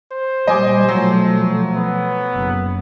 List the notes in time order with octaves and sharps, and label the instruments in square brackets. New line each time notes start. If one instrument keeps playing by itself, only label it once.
[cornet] C5
[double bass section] A#2 G3 [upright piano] D#5 G#5 D6
[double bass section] B2 F3 A3 [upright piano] F#3
[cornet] B3
[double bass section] F#1